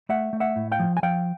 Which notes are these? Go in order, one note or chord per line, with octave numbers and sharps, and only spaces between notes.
A3 E5 F#5
A3
E5 F#5
A2
F5 G5
F3
G#5
F3 F5 G5